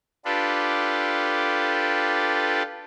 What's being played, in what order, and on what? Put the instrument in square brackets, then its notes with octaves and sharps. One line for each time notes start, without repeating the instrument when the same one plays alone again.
[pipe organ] D4 F4 G4 A4 B4